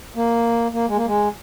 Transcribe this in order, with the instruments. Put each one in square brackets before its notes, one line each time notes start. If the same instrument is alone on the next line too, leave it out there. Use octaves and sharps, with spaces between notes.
[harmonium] A#3
A#3
G#3
A#3
G#3